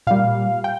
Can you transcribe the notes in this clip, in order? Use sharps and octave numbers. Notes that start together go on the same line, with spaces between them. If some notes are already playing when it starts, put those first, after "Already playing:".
A#2 G3 F5
G5